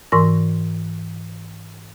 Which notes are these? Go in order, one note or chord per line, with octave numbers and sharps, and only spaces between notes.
G#2 E3 A#4 C6 C#6 A#6